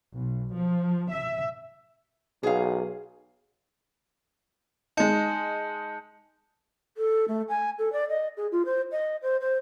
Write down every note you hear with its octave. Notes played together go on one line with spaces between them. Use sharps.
B1
F3
E5
B1 G#4 F5
G#3 D#4 A5 G6 C#7
A4
A3
G#5
A4
D5
D#5
G#4
F4
C5
D#5
C5
C5